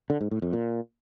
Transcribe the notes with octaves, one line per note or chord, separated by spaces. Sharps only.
D3
G#2
A2
F2
A#2